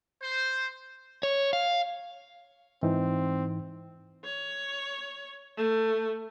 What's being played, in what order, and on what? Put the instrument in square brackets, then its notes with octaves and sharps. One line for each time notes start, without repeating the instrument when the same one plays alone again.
[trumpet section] C5
[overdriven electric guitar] C#5
F5
[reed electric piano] G#2 E3 D#4 [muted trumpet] C4
[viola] C#5
A3